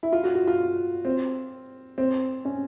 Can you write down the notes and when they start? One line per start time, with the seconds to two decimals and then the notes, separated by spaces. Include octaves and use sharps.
0.03 E4
0.12 F4
0.24 F#4
0.35 F#4
0.47 F4
1.05 C4
1.98 C4
2.45 C#4